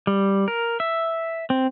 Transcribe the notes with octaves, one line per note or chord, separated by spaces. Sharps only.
G3
A#4
E5
C4